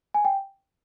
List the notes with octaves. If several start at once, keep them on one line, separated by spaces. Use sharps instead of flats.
G#5
G5